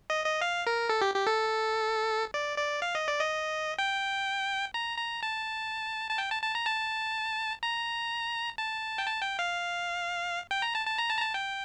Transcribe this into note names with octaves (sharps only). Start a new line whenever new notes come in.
D#5
D#5
F5
A#4
A4
G4
G4
A4
D5
D5
F5
D#5
D5
D#5
G5
A#5
A#5
A5
A5
G5
A5
A5
A#5
A5
A#5
A5
G5
A5
G5
F5
G5
A#5
A5
A5
A#5
A5
A#5
A5
G5